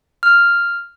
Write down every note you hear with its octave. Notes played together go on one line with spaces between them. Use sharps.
F6